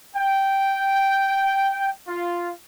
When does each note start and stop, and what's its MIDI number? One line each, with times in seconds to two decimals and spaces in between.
0.15 1.91 79
2.08 2.51 65